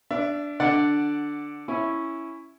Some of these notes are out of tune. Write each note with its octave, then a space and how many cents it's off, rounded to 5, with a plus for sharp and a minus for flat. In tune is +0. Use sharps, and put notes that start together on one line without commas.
D4 -10 E5 +30
D3 +0 D5 +0 F#5 +0
C#4 +0 E4 +0